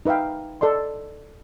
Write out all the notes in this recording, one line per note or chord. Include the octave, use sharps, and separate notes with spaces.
D#4 B4 E5 F5 G5
A4 D5 D#5 C6